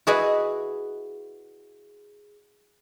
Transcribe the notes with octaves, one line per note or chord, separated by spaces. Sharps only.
E4 F#4 G#4 B4 D#5 E5